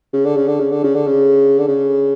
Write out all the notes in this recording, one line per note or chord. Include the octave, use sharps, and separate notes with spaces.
C#3
D3
C#3
D3
C#3
D3
C#3
D3
C#3
D3
C#3